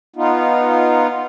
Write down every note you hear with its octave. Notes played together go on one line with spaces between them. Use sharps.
B3 D#4 F4